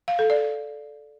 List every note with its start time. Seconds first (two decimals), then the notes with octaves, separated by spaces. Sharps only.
0.08 F5
0.19 A4
0.30 D5